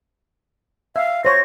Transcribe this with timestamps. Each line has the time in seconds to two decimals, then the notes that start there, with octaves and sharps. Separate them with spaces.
0.96 E5 F5
1.25 C5 C#5 A#6